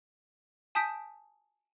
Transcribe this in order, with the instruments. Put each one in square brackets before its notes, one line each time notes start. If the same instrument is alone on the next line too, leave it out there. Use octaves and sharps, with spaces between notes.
[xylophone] G#5 A5 D#6 G6 B6 D7